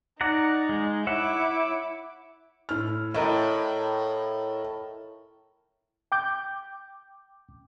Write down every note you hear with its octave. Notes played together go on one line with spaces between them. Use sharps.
D#4 D5 F#5 A#5
G#3
E4 C#5 E5 F#5 D6
A2 F6
A2 A#4 D#5 E5
G5 D6 G6